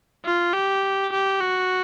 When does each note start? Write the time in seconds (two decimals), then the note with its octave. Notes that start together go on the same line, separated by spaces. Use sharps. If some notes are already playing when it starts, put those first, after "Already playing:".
0.25 F4
0.53 G4
1.12 G4
1.41 F#4